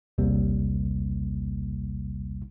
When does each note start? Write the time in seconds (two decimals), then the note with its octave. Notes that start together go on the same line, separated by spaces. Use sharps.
0.18 A#1 D#2 C3 G3 A#3